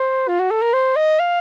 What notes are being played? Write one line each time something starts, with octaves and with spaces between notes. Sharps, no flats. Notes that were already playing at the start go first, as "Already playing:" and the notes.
Already playing: C5
F4
F#4
A4
A#4
C5
D#5
F5